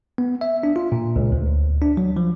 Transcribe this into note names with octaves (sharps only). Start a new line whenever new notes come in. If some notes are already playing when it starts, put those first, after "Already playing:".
B3
E5
D4
F4
A#2
C#2
D2
D4
F#3
F3